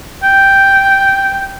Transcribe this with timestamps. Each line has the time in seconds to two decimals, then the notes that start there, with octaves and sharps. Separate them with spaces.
0.23 G5